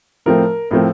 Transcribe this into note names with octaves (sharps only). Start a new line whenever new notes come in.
A2 F3 A3 C4 A#4
A2 F3 A3 C4 A#4